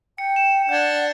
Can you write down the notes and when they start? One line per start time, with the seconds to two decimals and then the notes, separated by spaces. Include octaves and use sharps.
0.18 G5 C#7
0.36 E7
0.69 D4 F#5 G6 G#6